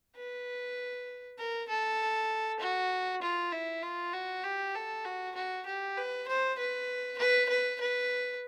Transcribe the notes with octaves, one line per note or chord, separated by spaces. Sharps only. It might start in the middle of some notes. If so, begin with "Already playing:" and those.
B4
A#4
A4
F#4
F4
E4
F4
F#4
G4
A4
F#4
F#4
G4
B4
C5
B4
B4
B4
B4